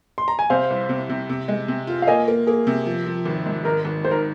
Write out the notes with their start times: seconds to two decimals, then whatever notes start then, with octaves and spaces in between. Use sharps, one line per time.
0.18 C6
0.28 A#5
0.39 G#5
0.50 C3 C5 F5
0.70 C2
0.89 C3
1.09 C3
1.29 C3
1.48 G#3
1.68 C3
1.87 F4
2.02 F5
2.07 A#3 D#5 G#5
2.28 A#3
2.47 A#3 G#4
2.67 C3
2.86 F3
3.06 F3
3.26 G#1
3.46 G#2
3.65 G#1 A#4
3.85 G#1
4.04 D#3 C5
4.11 A#4